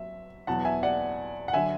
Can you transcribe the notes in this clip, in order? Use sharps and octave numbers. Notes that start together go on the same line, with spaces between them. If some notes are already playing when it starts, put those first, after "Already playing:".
Already playing: F#3 E5
E2 B2 F#3 F#5 A5
E5 G#5
D5 F#5
F#5
D3 F#3 E5 G#5